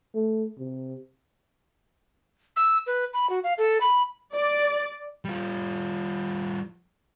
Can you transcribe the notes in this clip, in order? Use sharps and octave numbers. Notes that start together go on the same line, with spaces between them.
A3
C3
E6
B4
B5
F#4
F5
A4
B5
D5
G3 F4